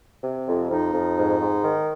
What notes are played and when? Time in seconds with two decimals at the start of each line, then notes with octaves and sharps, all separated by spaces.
0.24 C3
0.48 F2
0.70 F2 D#4
0.94 F2
1.17 G#2
1.41 G#2
1.64 D#3